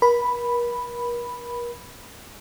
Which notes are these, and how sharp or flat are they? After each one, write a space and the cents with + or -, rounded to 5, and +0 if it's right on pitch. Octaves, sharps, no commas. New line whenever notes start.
A#4 +40 B5 +0